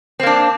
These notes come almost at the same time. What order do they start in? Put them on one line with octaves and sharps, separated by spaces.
C4 A#3 D4